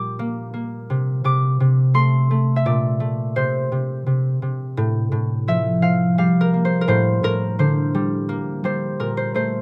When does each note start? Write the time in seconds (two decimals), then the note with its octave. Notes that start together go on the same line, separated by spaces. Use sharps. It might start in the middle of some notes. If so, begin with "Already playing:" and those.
Already playing: A#2 G3 D6
0.19 A#3
0.54 A#3
0.90 C3
1.24 C3 D6
1.60 C3
1.94 A3 C6
2.31 A3
2.56 E5
2.66 A#2 D5
3.00 A3
3.36 C3 C5
3.72 C3
4.06 C3
4.42 C3
4.77 A2
5.12 A2
5.48 F3 E5
5.82 F3 F5
6.18 G3 F5
6.41 A#4
6.54 A#3
6.65 C5
6.81 A#4
6.88 A2 C5
7.23 A2 A#4
7.59 D3 C5
7.94 G3
8.29 A#3
8.64 G3 C5
8.99 A#2 A#4
9.17 C5
9.34 A3 C5